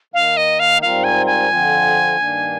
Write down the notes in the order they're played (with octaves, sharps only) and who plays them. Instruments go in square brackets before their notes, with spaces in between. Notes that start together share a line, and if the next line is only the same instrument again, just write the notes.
[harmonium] D#3 A#3 D#4 [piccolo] F5
[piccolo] D#5
F5
[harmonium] G#2 G3 C4 F4 A#4 [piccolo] F5
[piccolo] G#5
G#5
[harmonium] F2 D3 F3 C4 F4
G2 D#3 A#3 D4